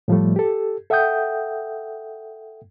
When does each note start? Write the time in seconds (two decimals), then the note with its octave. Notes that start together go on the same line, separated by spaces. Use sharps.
0.08 A2 F3 G3 A3
0.36 G4 A4
0.90 A4 E5 F#5 G5 D#6 G6